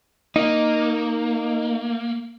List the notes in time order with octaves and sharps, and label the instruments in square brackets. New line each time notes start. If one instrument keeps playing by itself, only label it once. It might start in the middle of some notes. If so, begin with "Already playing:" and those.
[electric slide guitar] A#3 [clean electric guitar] D#4